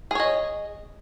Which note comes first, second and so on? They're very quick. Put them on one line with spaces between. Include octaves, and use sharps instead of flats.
G#4 C#5 D#5